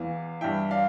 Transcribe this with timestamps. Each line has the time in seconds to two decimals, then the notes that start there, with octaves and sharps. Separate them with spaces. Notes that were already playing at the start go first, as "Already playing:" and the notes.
Already playing: E2 E3 F5
0.41 G2 E3 E5 G5
0.71 D5 F5